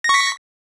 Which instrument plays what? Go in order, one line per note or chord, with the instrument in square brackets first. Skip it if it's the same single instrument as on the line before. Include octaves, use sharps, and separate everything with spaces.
[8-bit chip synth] A#6
C#6
B6